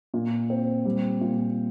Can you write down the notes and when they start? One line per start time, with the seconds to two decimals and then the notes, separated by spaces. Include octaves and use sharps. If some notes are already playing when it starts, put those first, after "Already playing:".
0.14 A#2
0.50 C4
0.85 G3
1.21 A#2